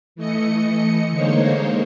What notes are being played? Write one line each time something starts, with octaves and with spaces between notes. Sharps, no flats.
E3 A3 D#5 C#7
D3 G#3 A#3 D#4 C5 C#5